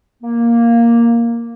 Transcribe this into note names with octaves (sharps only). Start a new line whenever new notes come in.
A#3